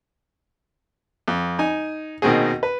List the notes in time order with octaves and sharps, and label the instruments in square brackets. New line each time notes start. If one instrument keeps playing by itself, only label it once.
[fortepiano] F2
D#4 G#5
B2 D#3 A#3 C4 F#4 G#4
B4